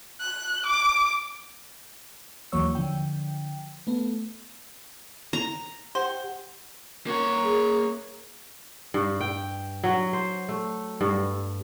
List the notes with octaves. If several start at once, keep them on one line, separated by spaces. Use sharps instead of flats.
F#6
D6
D#2 E3 F#3 A#3 C#5 E6
D3 F3 G5
A3 B3
A#5
G4 C5 F#5 G5
A#3 C#5 F#5 A#5
G#4
G2
G5
F#3
C5
A3
G2